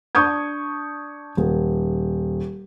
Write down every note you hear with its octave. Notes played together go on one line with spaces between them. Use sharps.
D4 C#6 D#6 G6 G#6
D#1